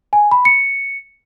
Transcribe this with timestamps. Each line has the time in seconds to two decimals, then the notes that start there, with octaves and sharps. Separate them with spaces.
0.13 G#5
0.31 B5
0.45 C#7